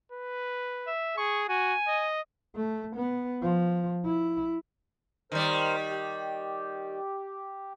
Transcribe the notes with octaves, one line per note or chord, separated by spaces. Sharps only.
B4
E5
G#4 C#6
F#4 G#5
D#5
A3
B3
F3
E4
D#3 G3 A#4 C5
G4